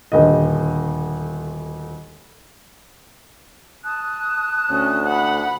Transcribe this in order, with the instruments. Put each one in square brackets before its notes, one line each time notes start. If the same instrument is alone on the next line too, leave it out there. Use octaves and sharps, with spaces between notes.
[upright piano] D#1 D2 D#5
[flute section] A5 D#6 F#6
[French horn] D2 [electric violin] C#4
[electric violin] F#5 B5